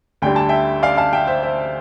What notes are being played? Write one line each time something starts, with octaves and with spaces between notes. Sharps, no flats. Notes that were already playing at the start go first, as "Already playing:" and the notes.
D2 D3 G3 D4 G5
A5
E5 G5
D5 F5
F5 A5
E5 G5
C5 E5
C5 E5